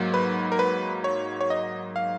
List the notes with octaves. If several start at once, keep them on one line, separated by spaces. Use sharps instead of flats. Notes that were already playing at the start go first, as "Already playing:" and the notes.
Already playing: G#2 F#3 A#3
B4
A#4
B4
C#5
C#5
D#5
F5